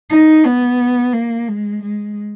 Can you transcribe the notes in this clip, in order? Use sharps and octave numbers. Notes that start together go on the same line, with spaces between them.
D#4
B3
A#3
G#3
G#3